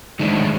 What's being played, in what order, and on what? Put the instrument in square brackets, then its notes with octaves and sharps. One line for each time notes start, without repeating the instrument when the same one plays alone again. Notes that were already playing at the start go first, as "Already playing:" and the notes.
[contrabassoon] G#2 [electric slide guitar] D#3 F#3 A3 D4